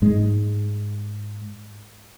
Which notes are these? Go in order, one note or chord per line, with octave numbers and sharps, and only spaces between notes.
G#2 G#3